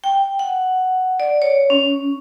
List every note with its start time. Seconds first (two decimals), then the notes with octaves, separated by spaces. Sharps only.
0.04 G5
0.39 F#5
1.20 D5
1.42 C#5
1.70 C#4